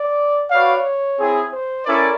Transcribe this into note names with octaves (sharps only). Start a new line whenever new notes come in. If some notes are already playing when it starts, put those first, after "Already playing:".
Already playing: D5
F#4 B4 C#5 D5 F5
C4 E4 G#4
C5
C#4 E4 A4 A#4 D5